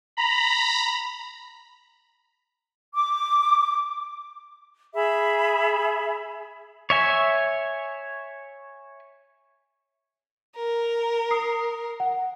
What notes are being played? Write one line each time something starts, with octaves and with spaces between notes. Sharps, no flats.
A#5 B5
D6
G#4 E5 B5
C#5 E5 G#5
A#4
D#6 C7
F#5